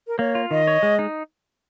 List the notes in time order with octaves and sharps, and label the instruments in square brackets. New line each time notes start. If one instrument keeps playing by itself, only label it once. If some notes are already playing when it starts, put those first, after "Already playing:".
[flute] A#4
[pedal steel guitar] A#3 [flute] C#5
[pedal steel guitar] F4
[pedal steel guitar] D#3 [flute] D#5
[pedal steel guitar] C#5
G#3
D#4